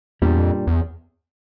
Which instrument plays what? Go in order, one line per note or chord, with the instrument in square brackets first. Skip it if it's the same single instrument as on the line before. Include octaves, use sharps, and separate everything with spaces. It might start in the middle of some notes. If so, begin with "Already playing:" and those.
[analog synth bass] E2 [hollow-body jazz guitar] A#2 G3 D4
[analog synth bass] F2
E2